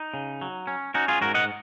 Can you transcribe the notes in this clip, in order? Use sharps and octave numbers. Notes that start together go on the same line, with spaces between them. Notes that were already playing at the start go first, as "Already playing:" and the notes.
Already playing: D#4
C#3
F#3
C#4
C#4 D#4 F#4
F4 G#4
G#2 F#4 A#4
D#5 F#5